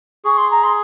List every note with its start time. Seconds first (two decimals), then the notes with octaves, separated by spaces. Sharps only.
0.25 G#4 C#6
0.38 C6
0.51 A#5
0.64 C6